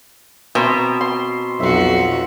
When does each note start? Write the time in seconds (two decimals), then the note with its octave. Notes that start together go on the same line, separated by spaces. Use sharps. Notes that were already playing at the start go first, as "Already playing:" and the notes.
0.55 B2 C4 A5 A#5
1.01 C6
1.60 B1 F2 F#4 E5 C6